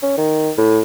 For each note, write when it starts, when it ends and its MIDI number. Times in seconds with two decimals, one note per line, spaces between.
0.03 0.14 61
0.17 0.51 51
0.58 0.81 45